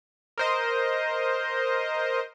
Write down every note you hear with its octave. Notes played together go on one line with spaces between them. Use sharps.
A#4 C5 D#5